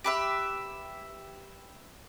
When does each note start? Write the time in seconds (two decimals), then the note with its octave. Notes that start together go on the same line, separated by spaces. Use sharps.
0.04 G4 B4 E5